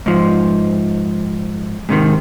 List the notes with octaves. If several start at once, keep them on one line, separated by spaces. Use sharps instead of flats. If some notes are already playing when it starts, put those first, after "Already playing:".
G#2 F3
G#2 C3 D#3